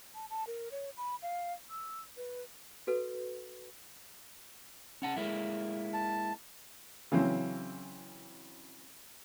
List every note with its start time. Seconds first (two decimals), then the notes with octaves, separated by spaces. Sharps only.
0.14 A5
0.30 A5
0.47 A#4
0.71 C#5
0.97 B5
1.22 F5
1.70 E6
2.17 B4
2.87 F#4 A4 B4
5.02 C#4 F#5 A5
5.16 G#3 A#3 E4
5.94 A5
7.12 C#3 E3 F#3 C4 C#4